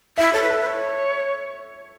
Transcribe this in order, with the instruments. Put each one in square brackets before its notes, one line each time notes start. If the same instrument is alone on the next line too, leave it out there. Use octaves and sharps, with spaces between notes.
[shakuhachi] E4 [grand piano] E5
[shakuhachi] A4 [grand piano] C#5
[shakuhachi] B4
[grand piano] A4
[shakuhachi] B4
C#5